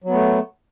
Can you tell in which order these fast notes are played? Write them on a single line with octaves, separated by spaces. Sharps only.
F#3 B3 A3